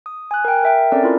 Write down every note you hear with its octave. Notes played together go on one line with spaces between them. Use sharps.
D#6
G#5 F#6
A#4 G5
A#4 E5 G5
C4 C#4 A4 A#4 D5
E4 F4 A#4